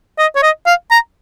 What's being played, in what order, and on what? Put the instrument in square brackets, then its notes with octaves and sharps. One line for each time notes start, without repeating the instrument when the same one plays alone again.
[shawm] D#5
C#5
D#5
F5
A#5